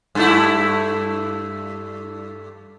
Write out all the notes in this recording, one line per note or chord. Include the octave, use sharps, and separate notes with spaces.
G2 A3 E4